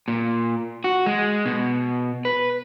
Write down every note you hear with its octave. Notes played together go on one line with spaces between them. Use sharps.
A#2
F#4
G#3
B2
B4